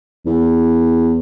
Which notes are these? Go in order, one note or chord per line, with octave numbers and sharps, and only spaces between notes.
E2